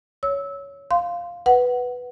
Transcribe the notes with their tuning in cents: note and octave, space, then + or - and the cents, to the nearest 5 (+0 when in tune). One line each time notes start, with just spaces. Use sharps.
C#5 +10 E6 -20
F5 +0 C6 -5
B4 +0 F#5 +0